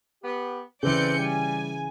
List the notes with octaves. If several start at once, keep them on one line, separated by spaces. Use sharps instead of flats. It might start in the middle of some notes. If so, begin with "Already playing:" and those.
B3 G4
C#3 E3 C4 A4 B4 D5 G6 C#7
G3 G#5